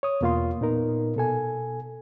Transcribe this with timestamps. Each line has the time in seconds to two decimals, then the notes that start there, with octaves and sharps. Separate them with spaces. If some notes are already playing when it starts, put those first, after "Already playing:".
0.03 C#5 D#6
0.21 E2 B2 A#3 F4 F5 C6
0.61 A#2 B3 D#4 A#4
1.17 B2 A4 G#5